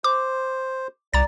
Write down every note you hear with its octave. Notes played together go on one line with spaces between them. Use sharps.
C5 D6
C2 D5 A#5 A6